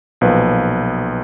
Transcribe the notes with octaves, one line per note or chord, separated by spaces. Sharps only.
B1 A#2 F3 B4